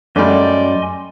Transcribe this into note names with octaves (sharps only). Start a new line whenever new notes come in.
F#2 G3 A3 D5 D#5 G#5 C6